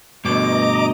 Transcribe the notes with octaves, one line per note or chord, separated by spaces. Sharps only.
G2 B2 D#5 A#5 D6